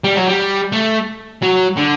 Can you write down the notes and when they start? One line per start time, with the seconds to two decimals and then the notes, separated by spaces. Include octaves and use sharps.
0.04 G3
0.16 F#3
0.28 G3
0.73 A3
1.43 F#3
1.77 D3